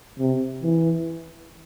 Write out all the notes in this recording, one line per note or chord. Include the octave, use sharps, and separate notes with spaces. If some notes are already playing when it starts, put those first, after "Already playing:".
C3
E3